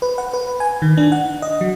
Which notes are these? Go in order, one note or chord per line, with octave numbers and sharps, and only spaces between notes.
B4
F#5
B4
G#5
D#3
D4
F#5
D#5
F#3